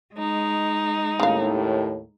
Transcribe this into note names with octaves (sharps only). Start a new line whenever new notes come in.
G#3 D#4
D#2 A2 C#3 F5